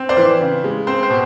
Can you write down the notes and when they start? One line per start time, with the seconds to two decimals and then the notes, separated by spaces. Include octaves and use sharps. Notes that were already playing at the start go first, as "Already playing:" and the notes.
Already playing: C4
0.09 C5 D5
0.17 E3
0.40 C#3
0.64 G#3
0.87 C4 C5
1.03 C5
1.10 B2